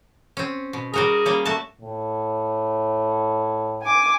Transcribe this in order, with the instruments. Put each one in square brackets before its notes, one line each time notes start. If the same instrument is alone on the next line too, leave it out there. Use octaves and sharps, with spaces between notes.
[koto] C4 C#4
B2
[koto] G3 F#4 A#4 [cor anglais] G#4
[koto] G3 A#3 C#4
A3 F#4 A5
[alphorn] A2
[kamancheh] G#5 D6